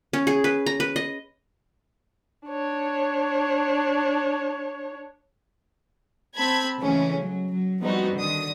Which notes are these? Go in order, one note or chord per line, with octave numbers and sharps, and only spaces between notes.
C#4
G#4
B4
A#5
B4
D#5
D4 C#5
C4 A5 B5 G#6
C#3 E3 G#3 A3 C#4
F#3
F#3
F3 G3 B3 C4 D#4 F#4
D3 D#3 D#6